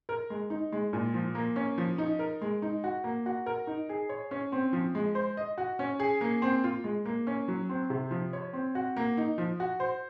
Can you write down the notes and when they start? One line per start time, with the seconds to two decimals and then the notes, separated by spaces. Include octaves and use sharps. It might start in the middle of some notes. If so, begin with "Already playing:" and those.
0.09 A#4
0.30 G#3
0.50 D#4
0.72 G#3
0.93 A#2
1.14 F3
1.35 A#3
1.56 C#4
1.78 F3
1.98 D#4
2.19 A#4
2.41 G#3
2.62 D#4
2.84 F#4
3.04 A#3
3.26 F#4
3.46 A#4
3.67 D#4
3.89 G#4
4.09 C#5
4.31 C#4
4.52 C4
4.73 F3
4.95 G#3
5.15 C5
5.37 D#5
5.58 F#4
5.79 C#4
6.00 G#4
6.21 A#3
6.42 C4
6.64 F4
6.84 G#3
7.05 A#3
7.27 C#4
7.48 F#3
7.69 C4
7.90 C3
8.11 F3
8.33 C#5
8.53 C4
8.75 F#4
8.97 A#3
9.17 D#4
9.38 F3
9.60 F#4
9.80 C5